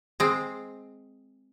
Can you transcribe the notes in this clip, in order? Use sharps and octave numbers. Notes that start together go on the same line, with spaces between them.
G#3 C4